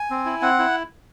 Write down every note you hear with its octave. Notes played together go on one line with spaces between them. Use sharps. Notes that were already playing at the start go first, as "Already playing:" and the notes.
Already playing: G#5
C4
E4
C4 F#5
E4